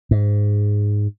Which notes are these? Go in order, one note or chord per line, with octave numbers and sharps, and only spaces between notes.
G#2